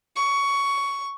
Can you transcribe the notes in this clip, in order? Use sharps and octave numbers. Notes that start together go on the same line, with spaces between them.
C#6